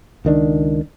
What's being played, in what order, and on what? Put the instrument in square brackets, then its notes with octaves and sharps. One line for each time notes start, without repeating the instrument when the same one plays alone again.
[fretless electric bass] C#2 D#3 D4